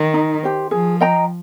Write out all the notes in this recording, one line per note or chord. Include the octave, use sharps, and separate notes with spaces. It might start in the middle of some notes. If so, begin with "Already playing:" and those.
Already playing: D#3
D#4
G4 C5
F3 G#4
D#5 G5 A#5